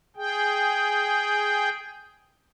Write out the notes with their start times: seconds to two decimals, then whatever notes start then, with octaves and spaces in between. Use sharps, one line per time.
0.16 G#4 G5